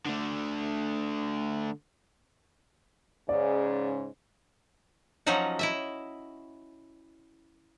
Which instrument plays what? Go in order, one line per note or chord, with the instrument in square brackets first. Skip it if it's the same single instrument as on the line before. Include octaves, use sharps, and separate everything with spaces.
[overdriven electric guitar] D3 A3
[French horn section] G#2 C#3 [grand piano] D5
[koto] F3 F#3 C#4 D#4 F#4
E4 D#5 E5